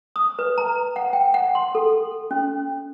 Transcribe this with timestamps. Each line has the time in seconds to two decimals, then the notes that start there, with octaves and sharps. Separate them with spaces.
0.16 D#6
0.39 B4
0.58 A#5
0.96 F#5
1.13 G5
1.34 F#5
1.55 C6
1.75 A4
2.31 C#4